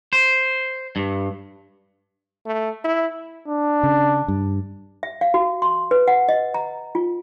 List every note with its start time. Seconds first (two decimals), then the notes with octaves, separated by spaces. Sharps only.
0.13 C5
0.96 G2
2.46 A3
2.84 E4
3.48 D4
3.83 C#3
4.28 G2
5.03 E5
5.21 F5
5.34 F#4
5.62 C6
5.91 B4
6.08 F#5
6.29 D#5
6.54 A#5
6.95 F4